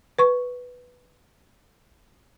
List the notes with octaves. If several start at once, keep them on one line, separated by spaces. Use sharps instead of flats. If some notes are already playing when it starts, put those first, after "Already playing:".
B4 C#6